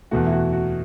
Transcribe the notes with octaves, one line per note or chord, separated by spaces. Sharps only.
E2 B2 A3 F#4
E4
F#4
F#4